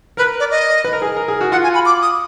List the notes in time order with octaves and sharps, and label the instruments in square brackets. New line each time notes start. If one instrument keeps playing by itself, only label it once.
[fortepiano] A#4 [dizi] B4
[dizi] D5
D#5
[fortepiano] B4
A#4
G#4
A#4
G#4
F#4
[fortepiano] F4 [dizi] F#5
[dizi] G#5
B5
D6
D#6